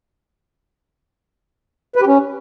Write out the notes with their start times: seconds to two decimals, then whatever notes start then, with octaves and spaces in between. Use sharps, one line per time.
1.96 B4
2.01 G4
2.07 C#4